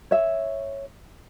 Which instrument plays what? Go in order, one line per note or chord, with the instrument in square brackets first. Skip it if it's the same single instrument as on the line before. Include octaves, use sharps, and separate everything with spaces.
[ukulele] C#5 E5